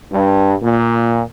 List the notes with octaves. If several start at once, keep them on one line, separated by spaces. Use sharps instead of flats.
G2
A#2